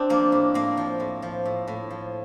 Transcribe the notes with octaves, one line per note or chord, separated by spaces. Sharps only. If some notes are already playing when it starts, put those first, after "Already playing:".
Already playing: C4 D4
F3 A#3
A2
A2 A#3
F3
A2
F3
A2
A2
F3